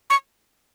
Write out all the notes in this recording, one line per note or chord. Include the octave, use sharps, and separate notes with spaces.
C#6